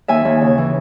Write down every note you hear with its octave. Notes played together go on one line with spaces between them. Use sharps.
D#2 E5 G#5
D#2
C#3
E3